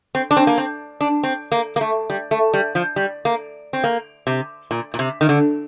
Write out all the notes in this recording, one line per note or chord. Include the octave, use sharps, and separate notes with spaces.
C4
D4
C4
A#3
C4
D4
C4
A#3
A#3
A3
G3
A3
G3
F3
G3
A#3
C4
A#3
C3
A#2
A#2
C3
D#3
D3